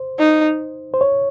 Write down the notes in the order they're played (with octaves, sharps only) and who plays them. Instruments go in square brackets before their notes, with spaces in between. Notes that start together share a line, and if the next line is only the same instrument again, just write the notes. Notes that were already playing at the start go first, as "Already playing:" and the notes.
Already playing: [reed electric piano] C5
[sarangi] D#4
[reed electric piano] C5
C#5